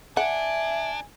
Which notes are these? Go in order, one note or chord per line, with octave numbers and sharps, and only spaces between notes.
D4 E5 F#5 G#5